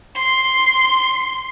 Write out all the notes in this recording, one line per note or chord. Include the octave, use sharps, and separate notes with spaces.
C6 C7